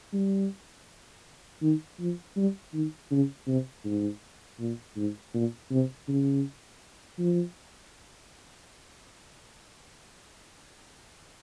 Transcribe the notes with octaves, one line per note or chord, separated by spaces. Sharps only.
G3
D#3
F3
G3
D#3
C#3
C3
G#2
A#2
G#2
A#2
C3
C#3
F3